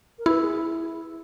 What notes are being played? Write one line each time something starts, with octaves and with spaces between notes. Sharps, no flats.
A#4
E4 B4
G#4
E4